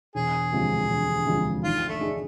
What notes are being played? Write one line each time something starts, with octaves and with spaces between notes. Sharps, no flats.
E1 G#4
D2 C3 F3 G#3
E1
D2 C3 F3 G#3
G#1 F4
A3
G#2 G#3 D4